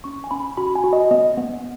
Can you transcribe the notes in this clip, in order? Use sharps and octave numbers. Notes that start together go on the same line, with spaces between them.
C#4 C#6
G#5
C#4 B5
F#4 B5
G#5
F#4
D#5
B3 D#5
B3